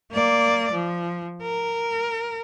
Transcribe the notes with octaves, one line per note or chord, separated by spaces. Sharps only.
A#3 D5
F3
A#4